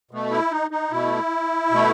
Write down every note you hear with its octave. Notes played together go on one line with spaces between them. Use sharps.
B2 A3
E4
D#4
D#4
B2 A3 E4
B2 A3